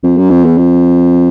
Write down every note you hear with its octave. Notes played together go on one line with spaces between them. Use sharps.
F2
F#2
F2
E2
F2